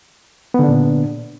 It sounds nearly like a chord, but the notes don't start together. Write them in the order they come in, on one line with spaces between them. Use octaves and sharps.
B3 D3 D4 A#2